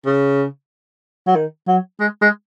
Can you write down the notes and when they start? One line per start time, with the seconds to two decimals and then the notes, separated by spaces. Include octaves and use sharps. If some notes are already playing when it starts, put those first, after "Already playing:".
0.06 C#3
1.27 F#3
1.36 D#3
1.68 F#3
2.00 G#3
2.22 G#3